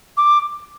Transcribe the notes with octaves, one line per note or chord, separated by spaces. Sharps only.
D6